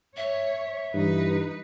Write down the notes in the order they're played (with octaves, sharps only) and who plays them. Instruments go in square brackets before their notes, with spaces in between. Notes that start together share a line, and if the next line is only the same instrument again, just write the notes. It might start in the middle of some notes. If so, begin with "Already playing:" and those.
[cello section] C#5 [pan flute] E5
[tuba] G2 [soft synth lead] E3 [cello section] D#4 B4